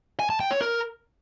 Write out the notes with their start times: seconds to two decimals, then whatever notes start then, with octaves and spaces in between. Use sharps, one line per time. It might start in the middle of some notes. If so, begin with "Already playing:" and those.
0.20 G#5
0.30 A5
0.40 G5
0.51 C#5
0.61 A#4